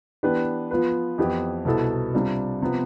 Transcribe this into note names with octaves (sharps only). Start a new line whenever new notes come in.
E3 B3 D4 G4 B4
F3 B3 F4 B4
F2 E3 B3 E4 G4
C2 B2 B3 E4 A4
C3 G3 D4 F4
C3 F3 B3